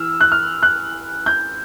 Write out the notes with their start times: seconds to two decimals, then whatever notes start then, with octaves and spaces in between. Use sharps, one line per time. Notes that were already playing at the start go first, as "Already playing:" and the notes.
Already playing: E3 E6 F6
0.21 F#6
0.32 F6
0.63 F#6
1.26 G6